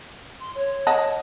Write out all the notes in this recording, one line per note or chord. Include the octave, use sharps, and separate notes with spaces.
C6
C#5
D#5 F#5 A5